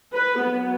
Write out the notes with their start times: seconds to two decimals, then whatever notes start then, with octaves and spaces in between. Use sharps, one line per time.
0.13 B4
0.42 F#3 B3